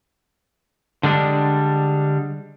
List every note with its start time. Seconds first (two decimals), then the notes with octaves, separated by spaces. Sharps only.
1.03 D3 G3 G#3 D4